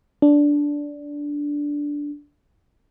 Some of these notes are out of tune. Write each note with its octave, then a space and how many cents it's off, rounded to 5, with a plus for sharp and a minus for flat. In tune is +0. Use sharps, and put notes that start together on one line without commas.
D4 -10